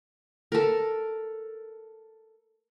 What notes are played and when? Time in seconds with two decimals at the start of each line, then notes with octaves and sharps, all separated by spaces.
0.52 A4 A#4